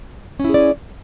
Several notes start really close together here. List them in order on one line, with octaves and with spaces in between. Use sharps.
C#4 E4 G#4 D5